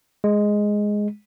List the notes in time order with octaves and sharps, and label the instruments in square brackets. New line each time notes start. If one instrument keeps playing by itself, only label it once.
[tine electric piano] G#3